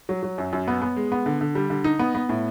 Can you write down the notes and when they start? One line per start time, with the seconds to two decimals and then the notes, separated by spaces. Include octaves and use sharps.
0.09 F#3
0.23 F#3
0.38 F#2
0.53 F#2
0.68 B3
0.82 B3
0.96 G#3
1.12 B3
1.26 D3
1.41 D3
1.55 G3
1.70 D3
1.84 D#4
1.99 B3
2.15 B3
2.29 A2